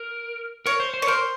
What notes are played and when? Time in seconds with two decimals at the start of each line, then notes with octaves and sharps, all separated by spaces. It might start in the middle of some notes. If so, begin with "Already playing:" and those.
Already playing: A#4
0.66 A#4 C#5
0.80 C5
0.94 C5
1.02 C#5
1.07 A#4 C5